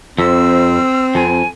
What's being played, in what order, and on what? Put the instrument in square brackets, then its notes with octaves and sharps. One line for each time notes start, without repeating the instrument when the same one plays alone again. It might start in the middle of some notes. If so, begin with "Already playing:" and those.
[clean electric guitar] F2 [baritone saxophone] C4 [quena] E6
[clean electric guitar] F2 [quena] G#5